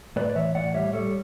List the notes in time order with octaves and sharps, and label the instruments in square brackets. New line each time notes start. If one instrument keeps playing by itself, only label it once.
[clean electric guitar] A2 B4 D5
D5
E3 C#5 E5
A2 D5 F#5
G3 C#5 E5
G3 A4 C#5